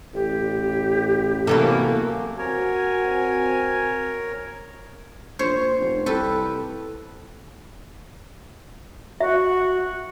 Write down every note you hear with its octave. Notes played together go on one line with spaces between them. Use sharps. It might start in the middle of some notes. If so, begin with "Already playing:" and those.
A1 G4
C3 E3 F#3 A#3 B3 A4
C4 F#4 A#4 C#5 G#5
A#1 C5 C#5
F1
C2 G4 A4 B4
F#4 E5